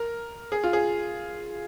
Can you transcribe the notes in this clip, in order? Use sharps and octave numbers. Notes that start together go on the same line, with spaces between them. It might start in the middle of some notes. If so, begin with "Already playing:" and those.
Already playing: A#4
G#4
F4
G#4